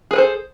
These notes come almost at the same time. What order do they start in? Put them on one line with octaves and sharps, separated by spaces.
G#4 B4 A4 C5